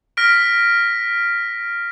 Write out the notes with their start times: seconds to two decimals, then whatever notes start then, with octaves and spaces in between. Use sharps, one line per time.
0.17 F6 A#6 B6 D7